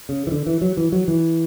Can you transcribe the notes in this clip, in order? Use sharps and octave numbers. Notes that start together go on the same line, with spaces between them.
C#3
E3
D3
E3
F#3
E3
F#3
E3